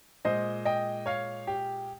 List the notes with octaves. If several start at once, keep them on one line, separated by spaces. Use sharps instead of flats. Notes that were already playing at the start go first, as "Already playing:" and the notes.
A#2 G#3 C5 D#5
D#5 G5
C#5 F5
G4